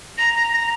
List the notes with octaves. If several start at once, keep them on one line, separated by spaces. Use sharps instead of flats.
A#5 A#6
A#6
A#6